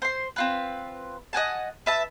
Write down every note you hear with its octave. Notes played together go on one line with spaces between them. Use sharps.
C5 C6
C4 F4 B4
D#5 F#5 G#5 A5
B4 E5 A5